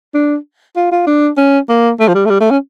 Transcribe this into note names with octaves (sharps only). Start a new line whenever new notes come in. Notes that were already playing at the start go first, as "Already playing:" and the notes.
D4
F4
F4
D4
C#4
A#3
A3
F3
G3
A3
G3
A3
C#4